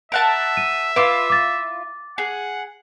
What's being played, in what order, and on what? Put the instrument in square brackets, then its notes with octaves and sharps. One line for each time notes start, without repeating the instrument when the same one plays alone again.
[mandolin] A#4 F#5 A5 [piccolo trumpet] E5
[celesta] D#7
[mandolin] E4 F4 [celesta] B4 D6
[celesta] D6 A6
[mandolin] G#4 [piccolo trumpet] F#5